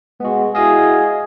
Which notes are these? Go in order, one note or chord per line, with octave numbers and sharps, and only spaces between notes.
G#3 B3 F#4
E4 F#4 G#4 D#5 F5 D#6